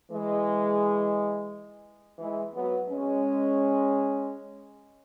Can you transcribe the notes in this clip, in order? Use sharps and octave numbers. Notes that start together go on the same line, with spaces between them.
E3 G#3
E3 G#3
F#3 B3
G#3 C#4